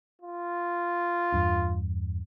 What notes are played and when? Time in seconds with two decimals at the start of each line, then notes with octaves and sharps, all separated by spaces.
0.21 F4
1.32 E2 G2 D4